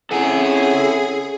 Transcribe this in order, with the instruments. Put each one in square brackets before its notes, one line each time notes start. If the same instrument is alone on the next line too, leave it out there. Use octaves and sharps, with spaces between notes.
[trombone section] C4 C#4 E4 [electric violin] G#4 [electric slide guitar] A4 F#5 G#5